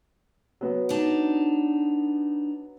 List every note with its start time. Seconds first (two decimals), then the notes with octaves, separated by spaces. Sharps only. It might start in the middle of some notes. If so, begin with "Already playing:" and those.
0.61 F#3 B3
0.89 D4 D#4